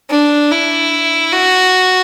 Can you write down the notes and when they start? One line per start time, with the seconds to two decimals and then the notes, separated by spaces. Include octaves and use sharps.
0.10 D4
0.51 E4
1.33 F#4